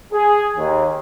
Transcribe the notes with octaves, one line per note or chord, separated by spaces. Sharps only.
G#4
D#2